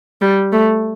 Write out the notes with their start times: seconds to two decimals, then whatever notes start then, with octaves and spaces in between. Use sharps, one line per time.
0.21 G3
0.52 A3